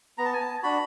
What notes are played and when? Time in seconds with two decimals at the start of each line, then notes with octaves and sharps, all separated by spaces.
0.18 B3 A#5
0.25 A5
0.33 G#5
0.41 A5
0.63 D4 F#4 B5